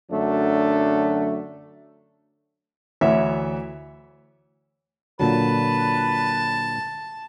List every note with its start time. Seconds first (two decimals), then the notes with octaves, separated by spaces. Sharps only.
0.12 F#2 D3 F#3 A3 D4
3.01 D2 E3 C#5 E5
5.20 A#2 D3 F#3 B4 A5